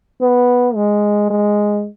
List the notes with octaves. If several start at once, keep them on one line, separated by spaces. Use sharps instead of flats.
B3
G#3
G#3